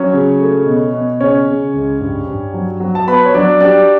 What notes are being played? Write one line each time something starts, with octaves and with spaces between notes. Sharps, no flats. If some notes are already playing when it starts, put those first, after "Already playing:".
Already playing: F#3 C#4 C#5
C#3
A3
B2
B2
C#3 C#4 C#5
C#3
C#2
G2
G2
F#3
F#3
A5
B3 B4 B5
C#5
F#3 D4 D5
G3 D4 D5